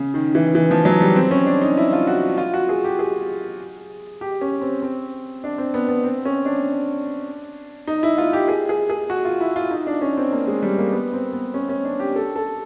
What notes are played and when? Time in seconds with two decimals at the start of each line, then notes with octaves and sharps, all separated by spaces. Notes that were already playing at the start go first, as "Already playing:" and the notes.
Already playing: C#3
0.14 D#3
0.35 E3
0.55 E3
0.71 F3
0.85 F#3
1.01 G3
1.16 C4
1.31 C#4
1.46 D4
1.62 D#4
1.77 E4
1.93 F4
2.07 F#4
2.38 F4
2.54 F#4
2.69 G#4
2.84 G4
2.99 G#4
4.21 G4
4.41 C#4
4.61 C4
4.82 C4
5.44 D4
5.58 C4
5.74 B3
5.89 B3
6.04 C4
6.25 C#4
6.45 D4
7.87 D#4
8.03 E4
8.18 F4
8.33 G4
8.48 G#4
8.69 G#4
8.90 G#4
9.10 F#4
9.25 F4
9.41 E4
9.56 F4
9.71 D#4
9.87 D4
10.02 C#4
10.17 C4
10.32 A#3
10.47 G#3
10.62 G3
10.78 A#3
10.92 B3
11.13 C4
11.33 B3
11.54 C#4
11.69 C#4
11.85 D4
12.00 G4
12.16 A4
12.36 A4